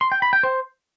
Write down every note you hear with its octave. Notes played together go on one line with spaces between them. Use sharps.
C6
G5
B5
G5
C5